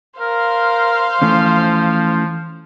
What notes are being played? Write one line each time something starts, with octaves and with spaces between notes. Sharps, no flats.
A#4 C5 F5
E3 F3 A3 C#4